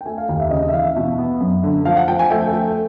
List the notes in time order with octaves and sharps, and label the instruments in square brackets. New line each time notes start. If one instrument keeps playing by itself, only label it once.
[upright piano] G5
A3 G#5
F5
D#2 F5
E5
C#3 D#5
D#5
E5
E3 F5
E5
B2
B3
F#2
D3
F3 F5
F#5
F3 G5
G#5
A3 G5
A3